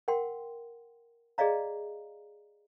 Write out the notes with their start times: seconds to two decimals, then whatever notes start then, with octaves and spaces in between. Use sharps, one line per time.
0.08 A#4 F#5 G5 C6
1.38 G#4 D5 D#5 F5 A#5